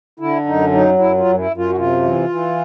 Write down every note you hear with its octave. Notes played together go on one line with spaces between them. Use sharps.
D3 E4
F#2 D#4
F#3 D#4
F#2 E4
F4
F#2
E4
F#2
F4
F#4
C3 F4
E3
E3